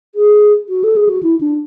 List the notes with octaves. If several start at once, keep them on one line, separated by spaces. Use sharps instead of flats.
G#4
F#4
A4
G#4
F#4
E4
D4